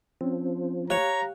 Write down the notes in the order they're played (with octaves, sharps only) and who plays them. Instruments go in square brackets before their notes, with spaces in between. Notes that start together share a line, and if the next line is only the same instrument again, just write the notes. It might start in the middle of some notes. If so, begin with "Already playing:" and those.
[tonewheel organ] F3 [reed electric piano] C4 C#4
[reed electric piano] G4 F5 F#6 [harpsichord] C#5 [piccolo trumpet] A#5